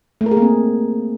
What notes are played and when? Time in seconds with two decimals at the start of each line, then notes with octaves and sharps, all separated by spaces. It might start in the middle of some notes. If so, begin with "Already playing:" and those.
0.21 A3
0.26 A#4
0.31 G#4
0.37 A#3
0.42 C4